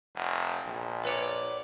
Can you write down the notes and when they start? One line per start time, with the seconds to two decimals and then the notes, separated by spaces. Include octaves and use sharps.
0.16 F1
0.65 A#1
1.05 B4 C#5 D5